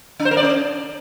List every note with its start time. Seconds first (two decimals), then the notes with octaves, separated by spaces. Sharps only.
0.20 D4
0.25 C5
0.31 A#4
0.37 D5
0.43 C#4